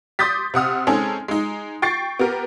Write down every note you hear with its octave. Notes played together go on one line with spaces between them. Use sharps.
C6 D6 D#6 G6 A6 B6
C3 F#5 D#6 F6
G#3 C4 C#4 D#4 G#4 A4
G#3 D#4
G5 C#6 A6 C7
B3 G4 A#4